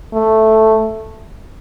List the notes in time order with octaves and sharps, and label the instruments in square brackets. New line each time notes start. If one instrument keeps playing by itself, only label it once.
[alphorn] A3